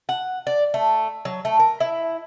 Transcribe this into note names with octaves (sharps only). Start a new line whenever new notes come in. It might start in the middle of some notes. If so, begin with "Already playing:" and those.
F#5
D5
A3
F#3
A3
A#4
E4